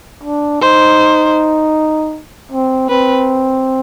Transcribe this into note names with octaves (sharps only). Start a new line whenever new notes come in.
D4
D#4 C5
C4
C4 B4